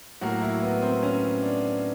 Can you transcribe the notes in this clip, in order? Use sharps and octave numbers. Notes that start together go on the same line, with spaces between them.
A2 F#3 A#3 F#4
E4
B3
C4
C#4
D4